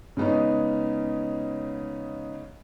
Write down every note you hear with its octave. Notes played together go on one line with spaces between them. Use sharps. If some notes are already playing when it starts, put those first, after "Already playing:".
C#3 G#3 B3 C#4 D#4